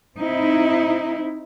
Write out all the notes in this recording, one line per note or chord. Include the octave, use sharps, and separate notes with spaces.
C4 D#4 E4